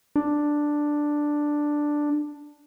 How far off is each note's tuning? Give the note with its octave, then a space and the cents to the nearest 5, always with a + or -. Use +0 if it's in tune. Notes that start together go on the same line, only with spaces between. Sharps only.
D4 +5